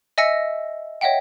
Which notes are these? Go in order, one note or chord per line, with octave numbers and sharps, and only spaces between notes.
D#5 E5 G#5 E6 A#6 C#7
C#5 D#5 E5 F#5 G5